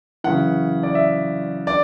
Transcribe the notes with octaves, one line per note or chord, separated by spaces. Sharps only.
F#2 C#3 E3 F#5
D5
E5
D3 D5